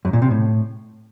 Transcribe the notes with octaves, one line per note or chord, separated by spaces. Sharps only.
F#2
A#2
C3
A2